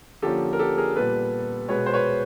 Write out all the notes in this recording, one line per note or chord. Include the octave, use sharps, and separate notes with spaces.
D3 F3 A#3 C#4 G4 A4
A#4
G4 A4
G#4 A#4
A#2 G3 B3 A4 B4
B2 G#3 B3 B4 C#5
C5
B4 C#5